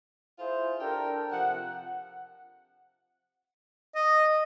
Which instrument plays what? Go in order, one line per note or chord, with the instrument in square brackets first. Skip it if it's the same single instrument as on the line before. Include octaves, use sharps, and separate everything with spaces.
[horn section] E4 F4 G#4 C5
D4 G4 A4 A#4 G5
C3 F3 F#5
[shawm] D#5